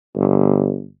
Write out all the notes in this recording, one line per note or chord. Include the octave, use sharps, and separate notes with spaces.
G1